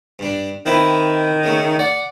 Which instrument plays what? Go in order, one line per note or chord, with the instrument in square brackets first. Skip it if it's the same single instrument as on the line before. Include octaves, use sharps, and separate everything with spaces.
[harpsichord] G2 D4
[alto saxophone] D#3 [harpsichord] C4 E4 B4
[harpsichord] C#3 A3
[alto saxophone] D5 [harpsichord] F#5